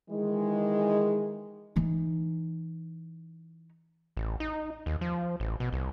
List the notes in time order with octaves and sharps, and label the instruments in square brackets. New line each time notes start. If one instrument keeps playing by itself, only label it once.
[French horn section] D#3 E3 G#3
[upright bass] E3 D#4
[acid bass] A1
D#4
D#2
F3
A1
B2
C2